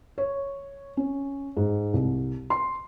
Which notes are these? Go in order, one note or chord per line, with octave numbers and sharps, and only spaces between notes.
C#5
C#4
G#2
C2
C6